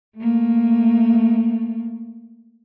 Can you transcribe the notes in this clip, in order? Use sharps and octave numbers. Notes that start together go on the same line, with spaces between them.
A3 A#3